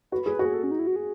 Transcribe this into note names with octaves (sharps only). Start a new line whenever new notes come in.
F#4 B4
G#4
F#4
G#4
A4
C#4
D#4
E4
F#4
G#4